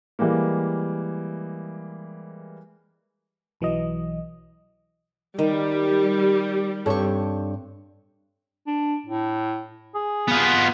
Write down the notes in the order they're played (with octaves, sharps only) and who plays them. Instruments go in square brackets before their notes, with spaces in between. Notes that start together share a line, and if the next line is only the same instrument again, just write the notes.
[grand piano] E3 G3 G#3 A#3
[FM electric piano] B1 E3 F#3 D#5
[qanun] D#3 [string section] G3
[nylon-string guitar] G2 A4 C#5 [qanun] C4 C#6
[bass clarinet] D4
A2
G#4
[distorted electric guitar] B3 F4